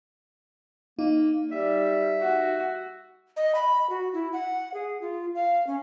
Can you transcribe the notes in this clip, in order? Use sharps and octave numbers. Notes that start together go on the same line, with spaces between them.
A#3 D#4
G3 E5
F#4
D#5
B5
F#4
E4
F#5
G#4
F4
F5
C#4